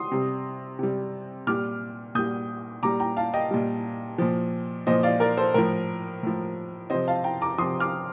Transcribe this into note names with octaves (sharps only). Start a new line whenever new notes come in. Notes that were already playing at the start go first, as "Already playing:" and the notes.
Already playing: C6 D#6
C3 G3
C3 G3
A#2 G3 D6 F6
A#2 G3 D#6 G6
A#2 G3 A#5 D6
G5 A#5
F5 A5
D#5 G5
A#2 G3
A#2 F3
A#2 F3 C5 D#5
D5 F5
A#4 D5
A4 C5
A2 F3 A#4
A2 F3
C3 F3 C5 D#5
F5 A5
G5 A#5
A#5 D6
C3 F3 C6 D#6
D6 F6